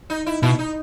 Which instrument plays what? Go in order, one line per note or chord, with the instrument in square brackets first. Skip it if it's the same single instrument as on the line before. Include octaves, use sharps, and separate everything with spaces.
[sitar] D#4
E4
[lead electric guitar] B2 [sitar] E4
[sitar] D#4